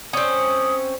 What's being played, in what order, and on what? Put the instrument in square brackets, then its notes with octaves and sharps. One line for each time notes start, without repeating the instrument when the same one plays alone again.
[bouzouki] C4 C#4 [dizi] D#6